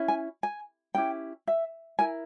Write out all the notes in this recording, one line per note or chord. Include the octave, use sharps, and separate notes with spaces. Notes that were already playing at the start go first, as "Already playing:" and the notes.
Already playing: C#4 E4
G#5
G#5
C#4 E4 G4 G5
E5
E4 A#4 G#5